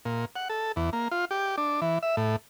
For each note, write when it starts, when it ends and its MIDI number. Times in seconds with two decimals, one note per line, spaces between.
0.05 0.25 46
0.36 0.48 78
0.49 0.72 69
0.76 0.90 40
0.93 1.08 58
1.11 1.25 65
1.31 1.56 67
1.58 1.81 62
1.82 1.98 52
2.03 2.16 76
2.17 2.36 45